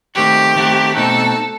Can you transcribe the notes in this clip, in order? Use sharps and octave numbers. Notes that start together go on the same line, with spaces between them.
D#3 A3 C4 F#4 G4
D#3 A3 C4 F#4
B2 A3 C4 D#4 F#4 A4